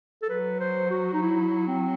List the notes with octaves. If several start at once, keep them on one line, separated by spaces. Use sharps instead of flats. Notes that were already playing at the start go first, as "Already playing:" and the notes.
A4
F#3 B4
C5
F#4
D#4
E4
C4